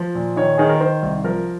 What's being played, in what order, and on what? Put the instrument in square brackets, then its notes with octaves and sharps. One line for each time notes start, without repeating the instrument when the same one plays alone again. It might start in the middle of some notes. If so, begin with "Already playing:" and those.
Already playing: [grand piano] F3
A#2
D#3 C#5
D#3 G#4
A#4
D#3 C5
C2
F3 A#4